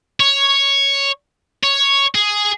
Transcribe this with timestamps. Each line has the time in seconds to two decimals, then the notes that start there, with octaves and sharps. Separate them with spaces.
0.20 C#5
1.64 C#5
2.15 G#4